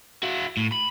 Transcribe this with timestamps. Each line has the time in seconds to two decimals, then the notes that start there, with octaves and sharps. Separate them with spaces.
0.23 E4 F#4
0.57 A2
0.72 B5